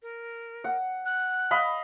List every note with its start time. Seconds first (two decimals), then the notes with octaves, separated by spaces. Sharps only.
0.02 A#4
0.64 F#5
1.06 F#6
1.51 D#5 F5 B5